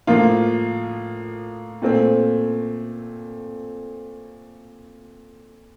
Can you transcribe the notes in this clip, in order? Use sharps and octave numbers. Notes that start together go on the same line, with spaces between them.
A2 F3 A#3 F4
A#2 A3 C4